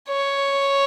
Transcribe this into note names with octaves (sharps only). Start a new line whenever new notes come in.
C#5